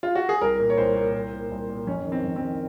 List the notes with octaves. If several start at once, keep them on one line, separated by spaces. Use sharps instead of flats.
F4
F#4
G#4
C2 A#4
A#2
C#5
C2 C5
A#2
C2
A#2
C2
A#2
F2 C#4
D#3
C4
F2
C4
D#3